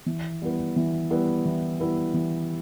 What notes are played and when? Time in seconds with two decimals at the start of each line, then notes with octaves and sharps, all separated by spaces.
0.06 E3
0.42 G3 B3 E4 B4
0.76 E3
1.10 G3 B3 E4 B4
1.45 E3
1.80 G3 B3 E4 B4
2.14 E3